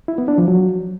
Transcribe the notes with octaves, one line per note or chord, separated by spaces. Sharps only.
E4
B3
D4
F3
F#3